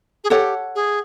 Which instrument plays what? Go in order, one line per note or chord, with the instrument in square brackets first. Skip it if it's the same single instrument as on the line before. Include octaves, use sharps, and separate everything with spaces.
[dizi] G#4
[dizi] G4 [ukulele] A4 C#5 F#5
[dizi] G#4